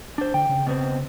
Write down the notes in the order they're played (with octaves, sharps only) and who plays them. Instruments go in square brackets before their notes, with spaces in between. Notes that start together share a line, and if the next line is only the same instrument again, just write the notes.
[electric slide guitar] D4 C5
[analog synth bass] D3 [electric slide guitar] G5
[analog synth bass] C#3
[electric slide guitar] B2 B3 C4